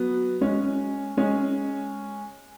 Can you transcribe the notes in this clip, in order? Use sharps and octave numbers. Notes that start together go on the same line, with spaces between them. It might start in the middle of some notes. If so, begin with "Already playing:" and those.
Already playing: F#3 B3
G#3 C#4
G#3 C#4